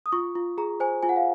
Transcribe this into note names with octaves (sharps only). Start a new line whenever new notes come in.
D#6
F4 C#6
F4
G#4 A#5
C5 G#5
F4 G#5
F#5
F5